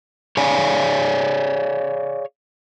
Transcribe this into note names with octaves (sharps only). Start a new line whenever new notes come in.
G#4 C#5 D5 F5 G#5